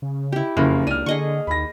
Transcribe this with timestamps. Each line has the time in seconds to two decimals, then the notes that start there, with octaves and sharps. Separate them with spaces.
0.02 C#3
0.32 E4 G4
0.57 F#1 F2 C#3 A#3
0.87 C#2 D4 F6 D#7
1.06 D3 G#4 D#5 C#6
1.47 D#2 B5 A#6